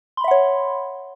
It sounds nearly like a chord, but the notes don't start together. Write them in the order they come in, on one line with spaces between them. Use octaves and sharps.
C6 B5 E5 F#5 C#5